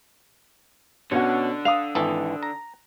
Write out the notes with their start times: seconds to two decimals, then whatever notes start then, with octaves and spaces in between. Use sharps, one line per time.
1.12 B2 D3 C#4 F#4 C#5
1.65 F5 D#6 F7
1.95 G#1 E3 A4
2.43 A#5